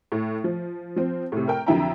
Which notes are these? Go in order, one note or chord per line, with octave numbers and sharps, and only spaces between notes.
A2
F3
F3 C4
A2 C3
A#4 G5
F2 D3 F#3 E4 G5 A#5